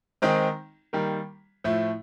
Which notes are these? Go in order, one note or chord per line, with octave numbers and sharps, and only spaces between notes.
D#3 G#3 C4 D#4
D#3 G3 A#3
A2 F3 A3